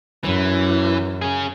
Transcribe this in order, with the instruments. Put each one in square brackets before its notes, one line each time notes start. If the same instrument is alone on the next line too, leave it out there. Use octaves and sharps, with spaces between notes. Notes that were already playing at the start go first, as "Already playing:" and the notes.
[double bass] F#2 [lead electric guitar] E3
[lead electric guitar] C#4 G#4